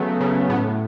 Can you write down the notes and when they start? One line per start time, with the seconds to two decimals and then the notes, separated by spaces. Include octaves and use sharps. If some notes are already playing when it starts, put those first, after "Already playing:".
Already playing: C#3 F#3 A3 B3
0.21 C#3
0.50 A2 B3